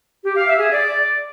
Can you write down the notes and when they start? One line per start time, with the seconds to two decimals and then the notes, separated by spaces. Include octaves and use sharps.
0.25 G4
0.36 F5
0.48 E5
0.60 G#4
0.71 D5